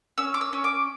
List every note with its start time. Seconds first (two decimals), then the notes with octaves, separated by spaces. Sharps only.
0.18 C#4 E6
0.34 D6
0.41 E6
0.53 C#4
0.64 D6